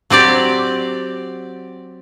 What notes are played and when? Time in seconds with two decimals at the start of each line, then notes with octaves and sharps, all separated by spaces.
0.10 F#3 C4 G4 D5